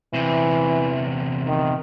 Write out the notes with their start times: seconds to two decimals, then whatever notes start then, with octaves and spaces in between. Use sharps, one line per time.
0.13 E2 C3 E3
1.46 D#3